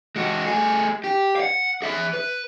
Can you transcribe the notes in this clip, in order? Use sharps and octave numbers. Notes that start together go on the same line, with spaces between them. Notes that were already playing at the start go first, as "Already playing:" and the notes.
G#3 F#4
A3 G#4
G4
F5 F#5
G#4 E5
B4